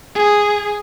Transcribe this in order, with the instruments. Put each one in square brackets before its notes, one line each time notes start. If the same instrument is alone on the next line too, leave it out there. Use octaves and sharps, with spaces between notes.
[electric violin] G#4